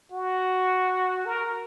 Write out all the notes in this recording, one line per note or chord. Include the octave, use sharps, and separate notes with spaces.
F#4
A#4